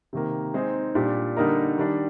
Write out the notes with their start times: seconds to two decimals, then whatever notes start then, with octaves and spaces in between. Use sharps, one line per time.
0.13 C3 D#3 A#3
0.54 G#3 C4 D#4 G#4
0.95 A#2 G3 D4 G4
1.36 D3 G3 A#3 D#4 A#4
1.78 D#3 G3 D4